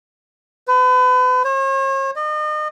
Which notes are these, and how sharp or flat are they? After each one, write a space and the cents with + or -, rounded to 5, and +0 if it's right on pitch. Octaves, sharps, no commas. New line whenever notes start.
B4 +35
C#5 -45
D#5 -35